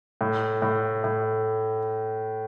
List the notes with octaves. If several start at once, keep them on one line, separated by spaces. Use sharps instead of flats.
A2
A2
A2